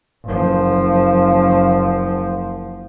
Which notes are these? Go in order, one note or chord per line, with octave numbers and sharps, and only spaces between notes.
F#1 F3